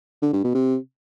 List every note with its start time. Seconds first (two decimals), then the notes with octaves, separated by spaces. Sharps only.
0.22 D3
0.33 G2
0.44 B2
0.55 C3